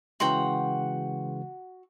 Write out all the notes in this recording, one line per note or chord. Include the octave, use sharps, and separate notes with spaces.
C#3 E3 G#3 F#4 G5 A#5 C6